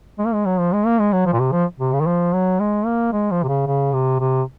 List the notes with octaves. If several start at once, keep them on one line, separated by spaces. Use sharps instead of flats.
G#3
A#3
G#3
F#3
F3
G#3
A#3
G#3
F#3
F3
A#2
C3
F3
C3
C#3
D#3
F3
F#3
G#3
A#3
G#3
F3
C3
C#3
C#3
C3
C3